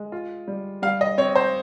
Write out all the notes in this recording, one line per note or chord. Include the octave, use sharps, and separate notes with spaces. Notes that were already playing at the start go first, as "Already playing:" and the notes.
Already playing: G#3
F4
G3
G3 F5
D#5
C4 C#5
C5